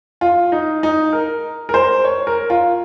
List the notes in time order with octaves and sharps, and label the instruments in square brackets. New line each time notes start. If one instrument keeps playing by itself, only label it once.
[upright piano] F4
D#4
D#4
A#4
A#4
C5
C#5
A#4
F4